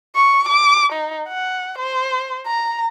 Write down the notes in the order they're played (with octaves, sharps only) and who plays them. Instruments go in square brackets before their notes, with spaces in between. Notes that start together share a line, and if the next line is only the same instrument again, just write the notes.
[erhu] C#6
D6
D#4
F#5
C5
A#5